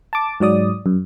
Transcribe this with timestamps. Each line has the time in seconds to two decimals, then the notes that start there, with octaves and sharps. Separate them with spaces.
0.13 A5 D6
0.40 G#2 F#3 D5 D#6
0.86 F#2